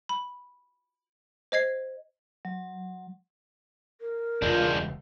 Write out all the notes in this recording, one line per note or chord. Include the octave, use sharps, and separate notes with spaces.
B5
C5 D#5 G#6 C7
F#3
A#4
E1 C#2 G#3 D4 F4 G6